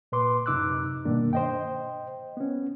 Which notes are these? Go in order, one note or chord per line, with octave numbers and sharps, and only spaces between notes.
A#2 B4 C6 D6
F#2 C3 D#4 D6 E6 F#6
G2 B2 D#3 A#3 D4
C5 D#5 G5
B3 C#4